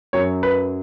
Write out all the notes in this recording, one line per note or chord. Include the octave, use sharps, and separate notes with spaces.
F#2 F#3 C#5
B4